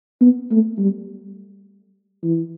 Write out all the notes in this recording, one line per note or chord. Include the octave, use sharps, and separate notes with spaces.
B3
A3
G3
E3